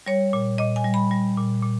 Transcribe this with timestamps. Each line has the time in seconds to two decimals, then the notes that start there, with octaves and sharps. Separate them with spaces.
0.06 G3 C#5
0.33 A#2
0.58 A#2 D#5
0.76 G#5
0.84 G3
0.94 B5
1.11 G3
1.37 A#2
1.63 A#2